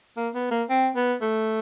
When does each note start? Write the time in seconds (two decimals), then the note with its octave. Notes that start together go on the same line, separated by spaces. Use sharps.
0.17 A#3
0.34 B3
0.51 A#3
0.69 C4
0.96 B3
1.22 A3